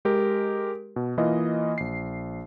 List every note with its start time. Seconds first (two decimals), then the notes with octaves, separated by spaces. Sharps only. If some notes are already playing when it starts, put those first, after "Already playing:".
0.05 G#3 G4 A#4
0.96 B2
1.18 E3 A#3 F4 D#5
1.78 A#1 C7